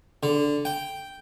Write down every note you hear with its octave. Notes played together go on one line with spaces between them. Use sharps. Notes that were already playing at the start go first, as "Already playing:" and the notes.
D3
G5